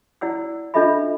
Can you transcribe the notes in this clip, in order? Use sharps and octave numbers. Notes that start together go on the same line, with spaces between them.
E4 D5 F#5 E6
D4 F4 A4 D#5 E5 B5